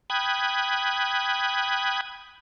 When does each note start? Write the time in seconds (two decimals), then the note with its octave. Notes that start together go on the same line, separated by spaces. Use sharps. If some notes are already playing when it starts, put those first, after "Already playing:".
0.10 G5 B5 D#6 F#6 G#6